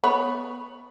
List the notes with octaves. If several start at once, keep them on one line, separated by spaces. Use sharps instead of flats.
B3 C#5 B5